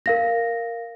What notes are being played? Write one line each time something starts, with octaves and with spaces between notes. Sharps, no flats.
A#4 F5 A#6